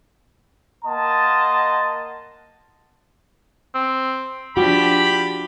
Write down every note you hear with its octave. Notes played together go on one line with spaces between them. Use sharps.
A#3 D#5 F#5 A5 C6
C4
F3 D4 F#4 G4 B5